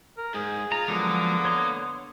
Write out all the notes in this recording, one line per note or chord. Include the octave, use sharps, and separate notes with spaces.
A#4
G#2 G#4
F4 A#5
D3 F3 F#3 G#3 A#3 B3 A#4
C#5 C6 D#6